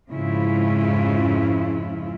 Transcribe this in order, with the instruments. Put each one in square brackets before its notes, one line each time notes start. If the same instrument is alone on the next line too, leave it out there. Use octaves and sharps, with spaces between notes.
[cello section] F2 G#2 C#3 G#3 E4 F4